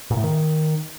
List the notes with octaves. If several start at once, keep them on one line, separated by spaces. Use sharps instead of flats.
A#2
A2
D#3